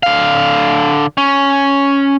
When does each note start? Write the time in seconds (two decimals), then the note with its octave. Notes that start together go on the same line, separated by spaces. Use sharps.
0.03 D3 F5
1.18 C#4